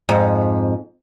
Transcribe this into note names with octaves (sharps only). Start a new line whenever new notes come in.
F2 G#2